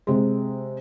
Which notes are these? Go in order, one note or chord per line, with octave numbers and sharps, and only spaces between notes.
C3 G#3